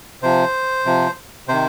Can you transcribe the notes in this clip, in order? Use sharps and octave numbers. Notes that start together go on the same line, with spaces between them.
C3 F3 C5
C3 F3
C3 D#3 C5